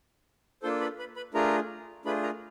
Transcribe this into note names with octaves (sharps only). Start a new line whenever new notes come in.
A#3 D4 F4 A4 C5 C6
B4 B5
B4 B5
B4 B5
A3 D4 F4 G#4 A#4 A#5
A3 D4 F4 G#4 B4 B5
A#4 A#5